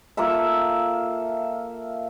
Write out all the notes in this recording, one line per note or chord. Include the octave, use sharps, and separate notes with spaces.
A#3 F4 A4 E5